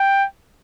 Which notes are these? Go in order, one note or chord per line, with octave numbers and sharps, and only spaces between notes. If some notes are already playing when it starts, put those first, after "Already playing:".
Already playing: G5